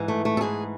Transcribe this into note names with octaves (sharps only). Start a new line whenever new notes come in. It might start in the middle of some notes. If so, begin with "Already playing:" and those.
Already playing: G#2 E3
A3
A3
A4
G#2 E3 G#4